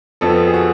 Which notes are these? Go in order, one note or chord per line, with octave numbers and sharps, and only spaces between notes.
F2 F3 B3 A4
G#4
F#4